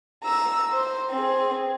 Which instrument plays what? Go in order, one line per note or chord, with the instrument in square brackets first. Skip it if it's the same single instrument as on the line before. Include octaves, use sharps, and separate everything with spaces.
[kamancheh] A#5 E6
C5
C4 G#4